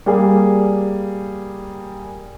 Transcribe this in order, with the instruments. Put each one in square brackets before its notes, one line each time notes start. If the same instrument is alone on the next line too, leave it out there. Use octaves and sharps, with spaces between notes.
[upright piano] G3 A#3 G#4